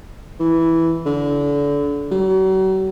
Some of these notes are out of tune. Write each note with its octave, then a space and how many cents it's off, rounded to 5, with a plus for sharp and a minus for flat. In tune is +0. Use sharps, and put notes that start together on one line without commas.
E3 -5
D3 -30
F#3 +40